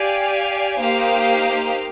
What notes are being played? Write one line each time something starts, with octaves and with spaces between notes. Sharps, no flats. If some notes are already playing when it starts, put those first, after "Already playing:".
Already playing: G4 D5 F5 G#5
A#3 D#4 G4 C5 F5